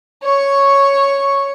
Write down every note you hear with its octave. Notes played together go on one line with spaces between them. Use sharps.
C#5 C#6